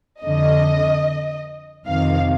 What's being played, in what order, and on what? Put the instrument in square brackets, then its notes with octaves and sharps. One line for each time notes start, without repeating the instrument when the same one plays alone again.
[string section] F2 D3 D#5
F2 C3 D#3 F5